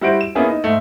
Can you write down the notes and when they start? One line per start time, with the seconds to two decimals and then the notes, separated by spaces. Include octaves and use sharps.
0.01 G3 E4 F#4 C5 D7
0.21 E7
0.35 A#3 B3 C#4 E4 G#4
0.48 D#4
0.64 G#2 A3